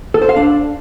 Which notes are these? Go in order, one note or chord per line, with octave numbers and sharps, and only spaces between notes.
A4
C5
F5
D4